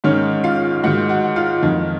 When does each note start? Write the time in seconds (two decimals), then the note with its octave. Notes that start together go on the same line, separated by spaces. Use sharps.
0.04 G#2 D#3 C#4 C#5
0.44 F4 F5
0.83 G#2 D#3 F#4 F#5
1.09 F#4 F#5
1.36 F4 F5
1.63 F2 D#3